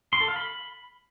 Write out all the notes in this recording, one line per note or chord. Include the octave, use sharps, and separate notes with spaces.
C6
A4
F5
B5